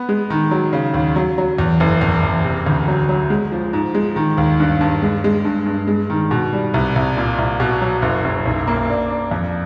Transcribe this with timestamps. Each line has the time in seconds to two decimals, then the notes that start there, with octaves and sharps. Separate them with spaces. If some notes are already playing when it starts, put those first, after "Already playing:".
Already playing: B3
0.09 G#3
0.30 D#3
0.51 F#3
0.73 C#3
0.94 D#2
1.16 F#3
1.38 F#3
1.58 E2
1.80 F#1
2.01 E2
2.23 E2
2.44 C3
2.66 D2
2.88 F#3
3.09 F#3
3.30 G#3
3.52 F3
3.73 G#2
3.94 G#3
4.16 D#3
4.38 D#2
4.60 G2
4.81 G2
5.02 G#3
5.24 G#3
5.45 G2
5.66 G2
5.87 G#3
6.10 D#3
6.31 B2
6.53 G3
6.74 C2
6.95 C2
7.17 A#2
7.38 C2
7.60 B2
7.81 F#3
8.02 F#1
8.24 F#1
8.45 B1
8.67 A#3
8.89 D4
9.10 D4
9.31 F2